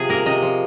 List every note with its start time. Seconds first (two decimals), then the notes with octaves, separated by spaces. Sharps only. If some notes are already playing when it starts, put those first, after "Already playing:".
Already playing: C3 F3 G#4
0.09 A#3 A#4
0.26 C3 D#5
0.42 F3